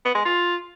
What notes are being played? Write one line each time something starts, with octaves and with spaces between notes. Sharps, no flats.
B3
G#3
F4